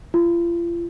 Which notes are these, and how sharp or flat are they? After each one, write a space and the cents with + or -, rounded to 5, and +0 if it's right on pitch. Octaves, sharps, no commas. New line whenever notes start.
F4 -40